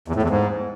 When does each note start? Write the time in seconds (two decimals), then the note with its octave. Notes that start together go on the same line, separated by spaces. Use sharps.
0.08 E2
0.15 A2
0.23 E2
0.30 G#2